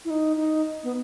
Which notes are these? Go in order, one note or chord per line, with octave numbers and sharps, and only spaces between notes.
E4
D#4
D#4
B3